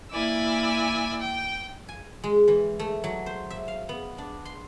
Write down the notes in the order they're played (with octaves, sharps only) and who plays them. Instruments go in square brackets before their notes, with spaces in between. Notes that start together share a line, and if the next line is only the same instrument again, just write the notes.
[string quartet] A#3 E4 D5 G#5 E6
G5
[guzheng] G#5
G#3
E3
A3
F#3
C5
E5
F5
B3
D4
C6